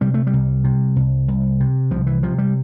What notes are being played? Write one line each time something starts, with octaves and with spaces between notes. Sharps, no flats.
C3 G3
A3
G3
C2
C3
C2
C2
C3
C2 F3
E3
C3 F3
G3